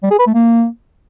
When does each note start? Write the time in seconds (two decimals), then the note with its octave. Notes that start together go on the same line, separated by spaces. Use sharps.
0.03 G3
0.11 G#4
0.19 B4
0.27 A3
0.34 A#3